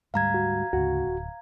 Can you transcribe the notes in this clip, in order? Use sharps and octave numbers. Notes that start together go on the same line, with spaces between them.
D2 G#2 G3 F5 A#5 G#6
F#4
D2 G#2 C#3 F#4
D1